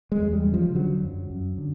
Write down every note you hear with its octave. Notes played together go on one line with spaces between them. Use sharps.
G#3
E2
G3
C#3
F3
D3 F#3
F#2
F#2
D3